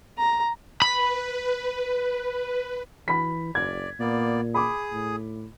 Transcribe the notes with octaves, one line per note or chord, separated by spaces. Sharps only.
A#5
B4 B5
E3 B5 B6
F#1 D5 G#6
A#2 A#3 B3 D5
G#4 B5 D6 D#6
A2